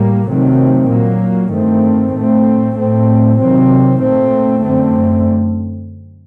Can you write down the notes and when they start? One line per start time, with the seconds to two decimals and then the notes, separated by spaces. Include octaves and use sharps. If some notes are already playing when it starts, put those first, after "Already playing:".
Already playing: A2 G3 A#3
0.27 C3 D#3 F#3 A3 C4
0.89 A#2 F#3 A#3
1.53 G2 D#3 A3 C4
2.14 A2 A3 C4
2.76 A2 A3 C4
3.39 C3 D#3 F#3 C4
4.01 A#2 A3 C4
4.63 F#2 D3 A3 C4